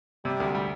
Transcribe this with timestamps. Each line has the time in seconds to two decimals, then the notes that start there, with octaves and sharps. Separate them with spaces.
0.25 C3 G3
0.40 D2
0.55 G3